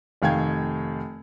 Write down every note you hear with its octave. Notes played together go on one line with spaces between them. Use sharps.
F1 D#3 F5 G5 G#6